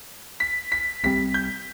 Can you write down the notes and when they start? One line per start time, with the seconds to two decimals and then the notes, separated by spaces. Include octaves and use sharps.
0.40 B6
0.72 B6
1.03 C2 C3 G3 C4 B6
1.34 G6